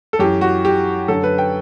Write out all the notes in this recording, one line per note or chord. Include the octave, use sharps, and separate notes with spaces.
A4
F#2 E3 G4
F#4
G4
F#2 D3 A4
B4
G5